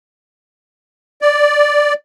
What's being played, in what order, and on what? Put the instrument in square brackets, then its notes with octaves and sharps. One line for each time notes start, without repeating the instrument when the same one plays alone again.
[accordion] D5